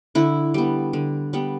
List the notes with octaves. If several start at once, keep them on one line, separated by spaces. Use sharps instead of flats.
D3 E4
G3 B3
D3
G3 B3